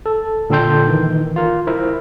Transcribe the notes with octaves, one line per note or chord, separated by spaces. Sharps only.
A4
A#2 D3 A4 G5 C6 G6
D#3 E3
F4 A#4
E4 A#4 C5